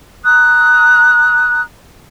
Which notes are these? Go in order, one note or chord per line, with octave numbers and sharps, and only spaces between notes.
A#5 D#6 F#6